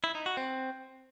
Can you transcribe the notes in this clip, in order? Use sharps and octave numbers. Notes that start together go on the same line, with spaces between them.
E4
D#4
F#4
C4